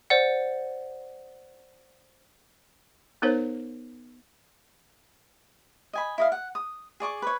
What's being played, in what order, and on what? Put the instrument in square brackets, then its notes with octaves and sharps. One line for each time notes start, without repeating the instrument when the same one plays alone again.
[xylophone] C5 D5 F#5
[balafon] B3 D#4 A#4 C5 C#5
[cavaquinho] D#5 G#5 B5
E4 D#5 F5
F#5
D#6
G#4 D5 C#6 D6
B4 C#5